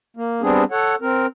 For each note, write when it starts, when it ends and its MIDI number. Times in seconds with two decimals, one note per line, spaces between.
0.17 0.42 58
0.42 0.64 55
0.42 0.64 59
0.42 0.64 60
0.42 0.64 62
0.42 0.64 68
0.72 0.95 69
0.72 0.95 73
0.72 0.95 78
1.02 1.27 60
1.02 1.27 70